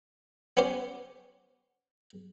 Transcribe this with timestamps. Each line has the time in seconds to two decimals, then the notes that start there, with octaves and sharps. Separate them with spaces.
0.57 B3 C#4 G4 C5